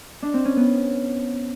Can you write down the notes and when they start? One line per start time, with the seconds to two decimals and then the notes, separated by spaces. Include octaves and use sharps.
0.23 D4
0.34 C4
0.45 C#4
0.57 B3